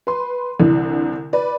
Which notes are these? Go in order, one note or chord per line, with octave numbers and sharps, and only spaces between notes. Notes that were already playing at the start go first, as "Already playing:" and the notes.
B4 C6
C2 D3 E3
B4 D5